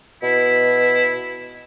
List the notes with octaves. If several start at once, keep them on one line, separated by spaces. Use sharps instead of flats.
B2 E4